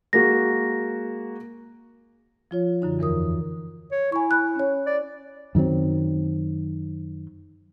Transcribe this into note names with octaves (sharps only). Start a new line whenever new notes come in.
G#3 A#3 F#4 A#6
F3 F4 C#5
F#2 D3 D#4
E2 E3 A#4 D#6
C#5
E4 G#5 C#6
G#5 B5 F#6
C#4 C#5
D5
F#2 D#3 F#3 C4